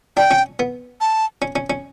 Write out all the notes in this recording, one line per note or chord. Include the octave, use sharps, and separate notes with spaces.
D4 G5
C#4
B3
A5
C#4
C#4
C#4